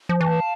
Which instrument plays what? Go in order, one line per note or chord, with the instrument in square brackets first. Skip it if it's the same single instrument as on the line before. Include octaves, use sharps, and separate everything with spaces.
[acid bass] F3
[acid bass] E3 [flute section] F5 A5